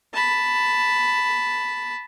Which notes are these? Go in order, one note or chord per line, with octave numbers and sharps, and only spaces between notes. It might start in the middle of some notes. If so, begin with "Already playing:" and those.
A5 B5